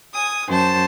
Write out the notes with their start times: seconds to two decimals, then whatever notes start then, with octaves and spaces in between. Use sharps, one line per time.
0.14 G#5 D#6
0.48 F#2 C5 A5